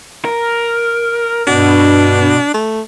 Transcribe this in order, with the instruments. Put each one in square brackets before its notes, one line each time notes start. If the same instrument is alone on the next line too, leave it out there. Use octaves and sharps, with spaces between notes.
[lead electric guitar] A#4
[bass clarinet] G2 [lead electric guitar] B2 F#4 [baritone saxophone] D4
[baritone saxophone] A3